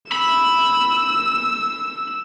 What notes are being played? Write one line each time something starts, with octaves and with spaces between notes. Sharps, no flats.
B5 E6